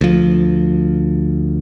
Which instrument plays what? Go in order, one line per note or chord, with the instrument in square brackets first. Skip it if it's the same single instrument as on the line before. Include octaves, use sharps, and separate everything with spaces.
[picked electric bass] D2 F3